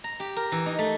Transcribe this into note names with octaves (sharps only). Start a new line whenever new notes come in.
A#5
G4
A#4
E3
D#4
A3